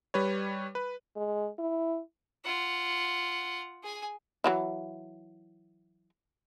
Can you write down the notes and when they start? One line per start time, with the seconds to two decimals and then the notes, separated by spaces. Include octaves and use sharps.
0.14 G3 B4 C#5
0.75 B4
1.16 G#3
1.59 E4
2.45 F4 F#5
3.84 G#4 G#5
4.44 E3 F#3 E4